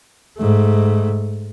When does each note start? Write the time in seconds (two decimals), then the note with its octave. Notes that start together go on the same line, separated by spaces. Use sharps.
0.38 G#2 A3